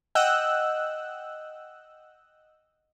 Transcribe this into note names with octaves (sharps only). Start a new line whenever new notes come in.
D#5 F#5 G5 E6 F#6